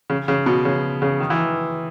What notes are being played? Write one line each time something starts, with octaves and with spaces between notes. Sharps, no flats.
C#3
C#3
B2
C#3
C#3
D#3
E3